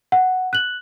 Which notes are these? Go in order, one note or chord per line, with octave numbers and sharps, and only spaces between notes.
F#5
F#6 F#7